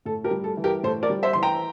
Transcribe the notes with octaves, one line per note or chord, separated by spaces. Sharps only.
A2 A4
G4 A#4
G3
A4
E3
G4 A#4
A2 A4 C5
A#4 D5
G3
C5 E5
E3 C6
G5 A#5